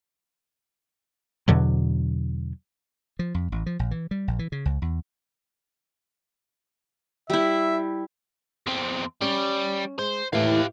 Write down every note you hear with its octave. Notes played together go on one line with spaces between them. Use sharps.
E2 B2 D3 F#3
F3
F2
A1
F3
A#1
E3
G3
A#1
E3
C#3
C#2
E2
G3 E4 E5
E2 C4
G3 C#4
G#3 C5
D#2 A2 E3 G4 F5